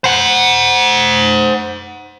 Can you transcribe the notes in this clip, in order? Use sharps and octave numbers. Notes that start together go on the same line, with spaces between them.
C5 F#5